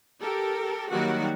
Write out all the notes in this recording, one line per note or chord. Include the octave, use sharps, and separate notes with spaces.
G4 A4 A#4
D#3 F#3 G3 A#3 F#4 F#5